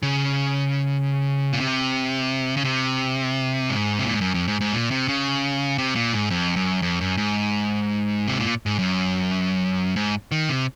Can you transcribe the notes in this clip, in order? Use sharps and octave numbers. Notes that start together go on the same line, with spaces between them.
C#3
A#2
C3
C#3
C3
G#2
C3
A#2
G#2
F#2
F2
G#2
G#2
A#2
C3
C#3
C3
A#2
G#2
F2
F#2
F2
F#2
G#2
C3
A#2
G#2
F#2
G#2
D#3
C3